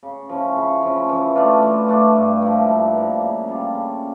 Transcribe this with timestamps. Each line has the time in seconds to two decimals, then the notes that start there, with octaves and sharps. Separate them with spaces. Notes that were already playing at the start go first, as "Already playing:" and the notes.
0.03 C#3
0.29 F3 C#4 E4
0.56 C#3
0.83 F3 C#4 E4
1.09 E3
1.35 A3 D4 F4
1.62 E3
1.88 A3 D4 F4
2.16 G2
2.42 F3 A#3 E4
2.68 G2
2.95 F3 A#3 E4
3.21 C#3
3.48 G3 D4 F4
3.75 C#3